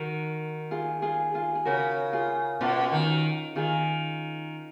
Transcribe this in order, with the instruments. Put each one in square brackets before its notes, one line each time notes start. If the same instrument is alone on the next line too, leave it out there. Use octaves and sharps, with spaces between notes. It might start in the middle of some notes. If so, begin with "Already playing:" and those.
Already playing: [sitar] D#3 [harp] F#4 A#4
[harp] F4 G#4
F4 G#4
F4 G#4
G#4
[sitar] C#3 [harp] F#4 A#4
[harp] F4 G#4
[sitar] B2 [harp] C#4 F4
[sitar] D#3
[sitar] D#3 [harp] F4 G#4